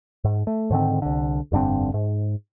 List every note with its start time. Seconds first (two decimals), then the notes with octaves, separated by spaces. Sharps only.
0.24 G#2
0.47 A3
0.70 G#2 D3 D#3 C4
1.02 C2 D3
1.52 F1 G2 D3 C4
1.94 G#2